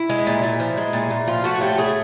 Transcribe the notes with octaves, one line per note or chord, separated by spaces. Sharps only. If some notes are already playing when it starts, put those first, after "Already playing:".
Already playing: E4
G#3
A#2
A#2
F3
G#3
A#2
A#2
F3 F4
A3 F#4
A2 G4
A2 G#4